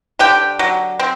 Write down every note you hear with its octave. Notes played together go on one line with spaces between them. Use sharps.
D3 G4 G5
F#3
C4